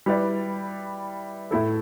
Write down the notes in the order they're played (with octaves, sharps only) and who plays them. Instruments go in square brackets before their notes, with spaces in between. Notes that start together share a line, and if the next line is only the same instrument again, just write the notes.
[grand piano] G3 E4 B4 D5
A2 A3 E4 A4